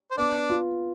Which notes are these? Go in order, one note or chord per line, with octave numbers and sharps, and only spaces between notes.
C5
B3 D4 D5
F4